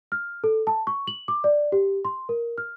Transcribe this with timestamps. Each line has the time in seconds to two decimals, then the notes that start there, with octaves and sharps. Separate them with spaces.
0.12 F6
0.44 A4
0.67 A5
0.87 C#6
1.07 F#7
1.28 D6
1.44 D5
1.72 G4
2.05 C6
2.29 A#4
2.58 F6